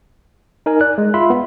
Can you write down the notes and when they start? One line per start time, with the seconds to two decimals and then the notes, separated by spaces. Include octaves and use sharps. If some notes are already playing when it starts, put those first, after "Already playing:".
0.66 D#4 A#4 G#5
0.81 D5 F#6
0.98 G#3
1.14 F4 E5 B5 C6
1.30 B3